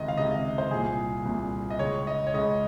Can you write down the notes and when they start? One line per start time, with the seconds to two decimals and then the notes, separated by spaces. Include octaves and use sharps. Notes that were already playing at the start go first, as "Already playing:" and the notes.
Already playing: C#2 C3 D#3 D#5
0.08 F5
0.17 C#2 C3 D#3 D#5
0.31 D#5
0.58 C5
0.71 C2 A#2 G#4
1.25 C2 A#2
1.70 D#5
1.79 C#2 C#3 C#5
2.07 D#5
2.27 C#5
2.34 C#2 C#3 D#5